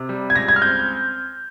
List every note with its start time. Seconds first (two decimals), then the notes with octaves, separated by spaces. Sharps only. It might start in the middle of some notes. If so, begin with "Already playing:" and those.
Already playing: C3
0.09 G3
0.30 G#6
0.35 C#2 A#6
0.48 G#6
0.56 F6
0.62 C4 G6